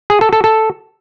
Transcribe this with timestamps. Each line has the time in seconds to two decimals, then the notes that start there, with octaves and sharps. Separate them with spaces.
0.10 G#4
0.21 A4
0.33 A4
0.44 A4